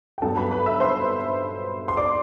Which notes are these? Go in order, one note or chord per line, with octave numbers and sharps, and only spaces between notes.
G5
G2 F#3 B3 A4 A5
B4 B5
B4 B5
E5 E6
C5 C6
C6
D5 D6